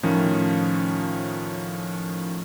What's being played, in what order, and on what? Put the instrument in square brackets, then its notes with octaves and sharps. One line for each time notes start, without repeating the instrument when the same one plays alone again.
[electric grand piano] A2 D#3 F3 C#4